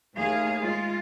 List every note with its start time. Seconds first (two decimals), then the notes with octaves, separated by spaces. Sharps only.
0.15 D#2 A2 G#4 F5
0.63 G#3 F4